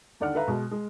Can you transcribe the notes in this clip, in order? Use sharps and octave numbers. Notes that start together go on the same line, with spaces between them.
D#2 D3 D5 F#5 F6
A4 B4 E5 F5 A#5
B2 G#3
G#3